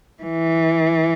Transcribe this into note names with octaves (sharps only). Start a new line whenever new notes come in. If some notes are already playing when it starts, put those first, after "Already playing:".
E3